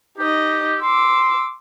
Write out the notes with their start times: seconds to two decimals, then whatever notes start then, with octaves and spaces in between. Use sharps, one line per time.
0.18 D#4 G4 D#5
0.81 C6 D6 E6